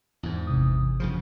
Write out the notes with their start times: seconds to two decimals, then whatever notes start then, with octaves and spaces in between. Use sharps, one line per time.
0.23 E2 G#2
0.47 G#1 C3 D#6
1.00 F#2 C#3 F3